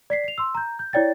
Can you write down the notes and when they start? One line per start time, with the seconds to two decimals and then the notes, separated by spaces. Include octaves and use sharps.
0.10 D5 B6 C7
0.24 C7 F7
0.38 C6 E6
0.55 A#5 G6
0.79 G6
0.93 E4 C#5 D5 G5 A6